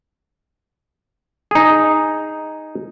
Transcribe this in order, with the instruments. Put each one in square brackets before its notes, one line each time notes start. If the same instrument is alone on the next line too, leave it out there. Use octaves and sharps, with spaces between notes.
[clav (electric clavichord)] D#4 G#4